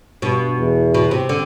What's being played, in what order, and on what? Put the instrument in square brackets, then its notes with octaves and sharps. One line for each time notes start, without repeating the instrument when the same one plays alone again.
[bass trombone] G2 [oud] B2
[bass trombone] E2
[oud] B2
C3
D3